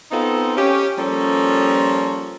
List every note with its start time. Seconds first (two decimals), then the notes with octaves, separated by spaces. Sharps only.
0.12 B3 C4 D#4 F4 A4
0.57 C#4 G4
0.97 F3 G3 A#3 C#4 A4